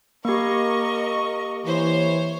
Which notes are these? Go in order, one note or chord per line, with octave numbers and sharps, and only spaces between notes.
A#3 G4 A#4 D#5 C#6
E3 C5 C#5